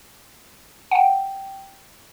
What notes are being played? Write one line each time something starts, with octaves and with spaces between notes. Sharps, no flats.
F#5
G5